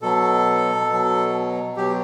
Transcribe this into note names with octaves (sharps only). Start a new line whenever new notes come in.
B2 F#3 A4
B2 F#3
B2 F#3 G4